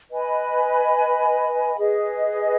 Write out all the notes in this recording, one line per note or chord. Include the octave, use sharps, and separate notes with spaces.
B4 D#5 G#5 B5
G#4 B4 D#5